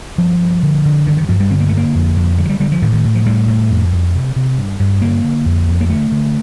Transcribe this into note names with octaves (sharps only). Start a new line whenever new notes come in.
G2 F3
G2
D3
D3
G2 D#3
D#3
G2 F3
G3
D3 C4
A#3
A3
D3 A#3
F2
F2
D3 G3
F3
G3
D3 G3
F3
A2 D#3
D#3
A2
F3
A2 G3
A2
F2
F2
C3
C3
G2
G2
D3 A#3
D3
F2
F2
A#3
D3 A3
D3